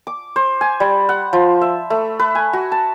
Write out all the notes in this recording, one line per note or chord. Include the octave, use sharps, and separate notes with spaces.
D6
C5
G#5
G3
F#5
F3
E5
A3
B4
G#5
F#4
A5